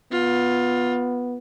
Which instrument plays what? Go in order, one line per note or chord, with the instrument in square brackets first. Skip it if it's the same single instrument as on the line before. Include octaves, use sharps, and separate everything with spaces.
[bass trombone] B3 [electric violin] F4